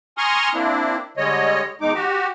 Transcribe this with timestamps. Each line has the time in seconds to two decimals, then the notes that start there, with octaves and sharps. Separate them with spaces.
0.18 G#5 A#5 C6 C#6 D#6 F6
0.54 A#3 C4 D4 E4
1.17 D3 G3 G#3 C#5 D#5
1.81 E2 G#3 D#4 D6
1.94 F#4 G4